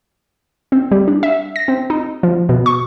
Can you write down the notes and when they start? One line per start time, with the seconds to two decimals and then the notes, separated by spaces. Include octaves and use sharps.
0.72 C4
0.91 G3
1.08 D4
1.23 E5
1.56 A#6
1.68 C4
1.90 D#4
2.23 F3
2.49 B2
2.66 C#6